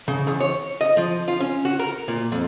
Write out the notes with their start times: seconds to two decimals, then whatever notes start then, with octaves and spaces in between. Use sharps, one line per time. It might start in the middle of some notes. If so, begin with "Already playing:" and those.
0.08 C#3
0.27 E2
0.41 C#5
0.81 D#5
0.97 F3
1.28 F4
1.40 C#4
1.65 F#4
1.79 A#4
2.08 A#2
2.32 F2